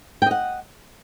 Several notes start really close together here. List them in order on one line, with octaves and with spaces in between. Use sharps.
G5 D#5 F#5